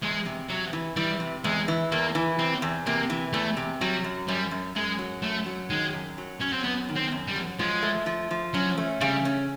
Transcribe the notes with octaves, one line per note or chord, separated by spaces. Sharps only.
E2 G#3
C3
C3 F#3
E3
E3 G3
C3
E2 G#3
E3
E2 A#3
E3
C3 C4
E2
C3 A#3
E3
E2 A3
C3
F#3 G3
F#2
F#2 G3
F#2
F#2 G#3
F#3
F#2 A3
F#3
D#3 G#3
F#2
F#3
F#3 C#4
C4
F#2 B3
D#3
C4
F#2
G3
F#3
F3 G#3
A3
F3
F3
F#3 C#4
A3
C#3 G3
C#4